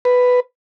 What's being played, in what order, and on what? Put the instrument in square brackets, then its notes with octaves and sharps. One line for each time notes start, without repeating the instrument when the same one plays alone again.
[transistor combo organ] B4